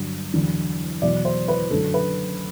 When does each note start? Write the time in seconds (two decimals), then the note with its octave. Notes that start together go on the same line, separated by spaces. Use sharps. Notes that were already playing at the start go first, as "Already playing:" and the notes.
Already playing: G2 D3 F#3
0.34 E2 D3 F#3
1.02 E2 B2 F#3 D5
1.25 C5
1.48 B4
1.71 F#2 D3 F#3 A4
1.94 B4